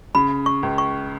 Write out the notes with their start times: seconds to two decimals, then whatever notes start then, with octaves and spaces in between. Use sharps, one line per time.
0.15 C#3 B5
0.46 C#6
0.63 C#2
0.78 C#6